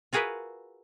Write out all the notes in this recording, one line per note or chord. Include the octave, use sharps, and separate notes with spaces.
F4 F#4 G#4 A#4 B4 E5